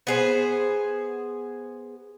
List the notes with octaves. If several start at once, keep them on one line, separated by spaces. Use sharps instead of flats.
B3 G#4 C5